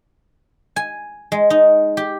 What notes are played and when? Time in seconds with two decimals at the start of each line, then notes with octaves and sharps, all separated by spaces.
0.76 G#5
1.32 G#3
1.50 D#4
1.97 G4